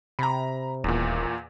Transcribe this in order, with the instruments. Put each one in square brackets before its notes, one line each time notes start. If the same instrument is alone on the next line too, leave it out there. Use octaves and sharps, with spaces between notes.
[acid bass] C3 [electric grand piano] A#5 B5
[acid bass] D#1 [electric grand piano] E2 A#2